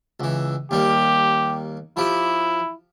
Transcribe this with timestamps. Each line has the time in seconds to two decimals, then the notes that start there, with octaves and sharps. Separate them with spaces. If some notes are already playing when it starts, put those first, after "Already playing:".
0.20 C#2 E3
0.71 D#2 G3 A#3 G4
1.97 F3 E4 G4